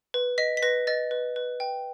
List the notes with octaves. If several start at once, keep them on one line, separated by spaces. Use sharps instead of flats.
B4
D#5 B6
B6
B4 A#6
D#5 A6
B4
B4
G5